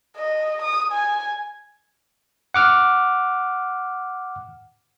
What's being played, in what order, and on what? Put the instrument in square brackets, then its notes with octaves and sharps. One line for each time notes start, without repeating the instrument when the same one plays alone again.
[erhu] D#5
D#6
G#5
[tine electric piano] F#5 D6 F6